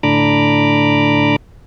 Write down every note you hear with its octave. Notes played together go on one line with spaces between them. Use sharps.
A2 D3 D4 A#5 B5 D6